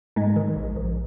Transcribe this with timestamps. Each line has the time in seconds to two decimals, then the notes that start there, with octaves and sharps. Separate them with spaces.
0.16 G#2 G#3
0.36 D#3
0.56 A#1
0.76 A#1